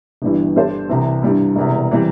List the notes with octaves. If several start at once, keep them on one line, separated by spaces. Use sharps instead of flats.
G1 G2 E3 G3 E4
G2 G3 D4 A4 C5
C2 C3 E3 C4
G2 G3 E4
E1 E2 C3
E3 G3 C4